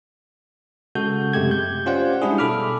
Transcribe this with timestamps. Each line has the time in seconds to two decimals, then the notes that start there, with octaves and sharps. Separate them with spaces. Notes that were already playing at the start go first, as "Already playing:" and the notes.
0.95 C#3 G#3 F#4 A4 G6
1.33 F#2 C3 G#3 A3 G4 G#6
1.51 G6
1.86 C#4 F4 G4 C5 D5 F#5
2.22 G3 G#3 D4 E4 G#4
2.38 B2 A4 B5 D6 F6